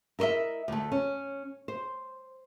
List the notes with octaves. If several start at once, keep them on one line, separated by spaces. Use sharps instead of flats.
E4 A#4 B4 D#5 E5
D2 A3
C#4
C5